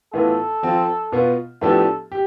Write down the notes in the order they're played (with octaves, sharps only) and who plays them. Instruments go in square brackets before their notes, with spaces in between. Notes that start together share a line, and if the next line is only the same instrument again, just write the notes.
[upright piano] A2 E3 B3 F4 [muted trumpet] A4
[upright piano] F3 C4 F4
B2 B3 F4
[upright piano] A2 F3 B3 D4 G4 [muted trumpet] A4
[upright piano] G4